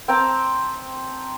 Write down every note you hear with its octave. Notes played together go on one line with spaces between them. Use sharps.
C4 G5 A5 A#5